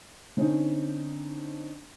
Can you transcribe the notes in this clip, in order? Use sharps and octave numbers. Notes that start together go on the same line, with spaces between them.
D3 C4 C#4 D#4